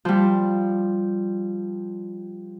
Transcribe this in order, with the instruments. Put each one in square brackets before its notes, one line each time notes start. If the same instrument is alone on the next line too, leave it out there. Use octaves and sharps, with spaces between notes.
[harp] F3 G3